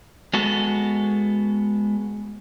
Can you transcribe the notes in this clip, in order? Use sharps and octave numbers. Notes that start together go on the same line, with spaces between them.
G#3 B3 F#4 A4